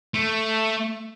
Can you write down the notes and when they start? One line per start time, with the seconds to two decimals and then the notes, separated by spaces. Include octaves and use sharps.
0.14 A3